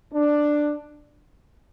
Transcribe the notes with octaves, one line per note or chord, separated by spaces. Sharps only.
D4